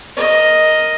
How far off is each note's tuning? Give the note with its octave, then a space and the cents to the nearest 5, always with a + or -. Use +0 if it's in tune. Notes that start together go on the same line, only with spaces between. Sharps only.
A#4 +0 D#5 +0